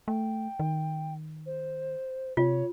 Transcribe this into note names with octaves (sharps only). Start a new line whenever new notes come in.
A3 G5
D#3
C5
C3 F4 C#5